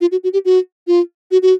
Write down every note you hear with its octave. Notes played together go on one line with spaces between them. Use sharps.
F4
F#4
F#4
G4
F#4
F4
F#4
F#4